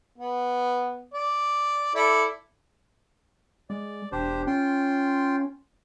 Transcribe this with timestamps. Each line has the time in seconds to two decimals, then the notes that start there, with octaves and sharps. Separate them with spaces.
0.18 B3
1.14 D5
1.95 E4 A4 D5
3.70 G#3 D5
4.12 E1 D4 G4 C5
4.47 C#4 F4 G5 C6